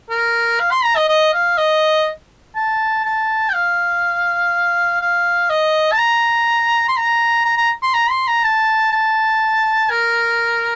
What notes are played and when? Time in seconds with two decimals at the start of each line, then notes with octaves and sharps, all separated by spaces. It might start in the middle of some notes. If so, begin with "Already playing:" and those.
0.10 A#4
0.60 F5
0.71 C6
0.84 A#5
0.96 D#5
1.08 D#5
1.34 F5
1.57 D#5
2.56 A5
3.05 A5
3.49 G5
3.54 F5
5.01 F5
5.50 D#5
5.92 A5
5.98 A#5
6.88 C6
6.97 A#5
7.45 A#5
7.58 A#5
7.82 C6
7.94 A#5
8.10 C6
8.28 A#5
8.44 A5
8.92 A5
9.90 A#4